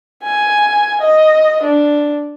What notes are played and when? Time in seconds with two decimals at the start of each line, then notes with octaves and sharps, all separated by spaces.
0.23 G#5
1.01 D#5
1.63 D4